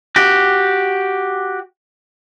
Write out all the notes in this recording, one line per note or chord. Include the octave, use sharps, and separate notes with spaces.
F#4 G4